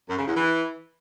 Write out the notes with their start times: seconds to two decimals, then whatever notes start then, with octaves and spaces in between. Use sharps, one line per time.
0.09 F#2
0.18 C#3
0.27 E2
0.36 E3